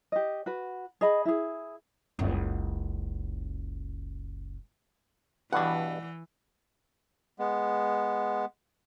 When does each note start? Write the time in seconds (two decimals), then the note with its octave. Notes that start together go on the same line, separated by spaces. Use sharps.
0.12 G4 D#5
0.46 F#4 B4
1.01 G#4 D#5 B5
1.25 E4 G#4
2.19 F#1 C#2
5.53 G2 B2 E3 D5 F#5
7.39 G#3 B3